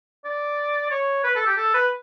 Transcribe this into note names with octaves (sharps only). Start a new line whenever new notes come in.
D5
C#5
B4
A4
G4
A4
B4